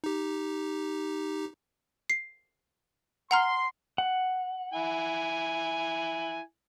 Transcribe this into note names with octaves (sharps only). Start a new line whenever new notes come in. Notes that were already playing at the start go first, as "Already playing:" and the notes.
D#4 G4
C7
F#5 A#5 C6 F6
F#5
E4 G#5